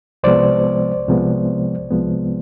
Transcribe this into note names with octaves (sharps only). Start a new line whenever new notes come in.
C2 C3 F3 G#3 B3 C5 D5
C2 C3 F3 G#3 B3
C2 C3 F3 G#3 B3